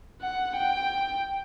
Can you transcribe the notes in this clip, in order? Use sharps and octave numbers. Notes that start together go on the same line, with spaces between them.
F#5
G5